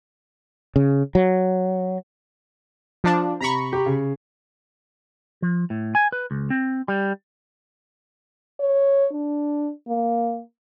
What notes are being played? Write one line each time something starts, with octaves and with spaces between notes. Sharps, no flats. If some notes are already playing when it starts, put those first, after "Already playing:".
C#3
F#3
F3 D4
C3 A#5 B5 C#6
G4
C#3
F3
A2
G#5
B4
C#2
C4
G3
C#5
D4
A#3